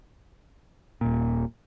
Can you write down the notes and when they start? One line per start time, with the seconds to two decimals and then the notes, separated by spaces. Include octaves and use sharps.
1.01 D#1 A#2